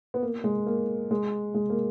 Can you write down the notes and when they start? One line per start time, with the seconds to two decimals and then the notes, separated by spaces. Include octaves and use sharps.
0.14 B3
0.22 A#3
0.44 G#3
0.67 A#3
1.11 G#3
1.54 G#3
1.70 A#3